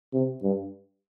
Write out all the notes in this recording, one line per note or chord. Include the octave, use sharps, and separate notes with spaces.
C3
G2